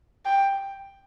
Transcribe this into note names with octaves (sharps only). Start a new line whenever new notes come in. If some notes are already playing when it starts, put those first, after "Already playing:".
G5